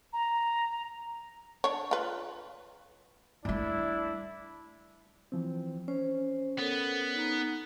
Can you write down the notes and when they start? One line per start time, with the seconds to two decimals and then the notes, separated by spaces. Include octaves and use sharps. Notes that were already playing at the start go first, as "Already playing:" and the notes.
0.13 A#5
1.64 D4 C#5
1.91 F4 B4
3.45 G3 A3 D4 E4
5.32 E3 F3 C4
5.88 C#4 C5
6.59 B3 A4 A#4 C#5
7.14 D#4 A#5